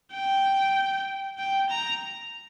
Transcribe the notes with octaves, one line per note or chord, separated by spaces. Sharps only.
G5
G5
A#5